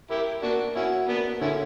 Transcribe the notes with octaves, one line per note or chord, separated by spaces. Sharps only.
E4 G4 A#4
A#3 D4 F#4
C#4 E4 F#4
A#3 B3 D4
D3 C#4 E4